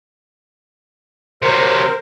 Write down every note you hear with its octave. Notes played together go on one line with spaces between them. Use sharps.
C3 F#3 A#4 C5